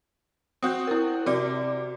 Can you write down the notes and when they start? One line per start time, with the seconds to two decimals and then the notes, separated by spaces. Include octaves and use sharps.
0.62 C4 F#4 D#6 G6
0.87 E4 A#4
1.26 C3 F#4 D5 D6